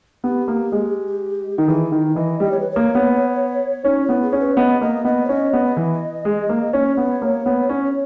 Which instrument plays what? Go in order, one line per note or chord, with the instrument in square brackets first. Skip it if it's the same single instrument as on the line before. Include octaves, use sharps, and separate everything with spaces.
[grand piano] B3 [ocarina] G4
[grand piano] A#3
G#3
[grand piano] D#3 [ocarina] A#4
[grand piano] E3 [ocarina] G#4
[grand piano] D#3 [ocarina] A#4
[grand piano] E3 [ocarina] D#5
[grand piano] G3 [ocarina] D#5
[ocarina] C#5
B4
C#5
[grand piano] A#3
B3
[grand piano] C#4 [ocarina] D#4
[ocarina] E4
[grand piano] B3
[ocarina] G#4
[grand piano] C#4
[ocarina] B4
[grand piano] B3 [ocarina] D#5
[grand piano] A#3 [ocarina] D#5
[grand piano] B3 [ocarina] D#5
[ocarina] C#5
[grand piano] C#4 [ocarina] D#5
[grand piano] B3
[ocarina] D#5
[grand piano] E3
G#3
A#3
[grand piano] C#4 [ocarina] C#5
[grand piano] B3
A#3
B3
C#4